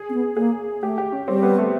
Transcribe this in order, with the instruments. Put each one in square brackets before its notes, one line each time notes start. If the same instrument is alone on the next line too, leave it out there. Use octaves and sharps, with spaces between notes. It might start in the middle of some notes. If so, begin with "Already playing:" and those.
Already playing: [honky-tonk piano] G#4
[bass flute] C4
B3
[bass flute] A#3 [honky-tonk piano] G#4
[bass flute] A3 [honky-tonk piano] G4
[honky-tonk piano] G4
C#4
[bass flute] G3 [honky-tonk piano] C4
[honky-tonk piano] B3
A3